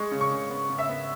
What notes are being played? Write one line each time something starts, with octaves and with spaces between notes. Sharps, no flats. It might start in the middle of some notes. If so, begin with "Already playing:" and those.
Already playing: G#3 C#6
C#3
C#6
C#3
B3
C#3
E5
B3